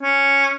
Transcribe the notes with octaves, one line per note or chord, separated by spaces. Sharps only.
C#4